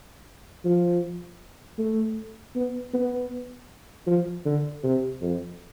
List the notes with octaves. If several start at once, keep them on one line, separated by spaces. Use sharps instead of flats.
F3
A3
B3
B3
F3
D3
C3
F2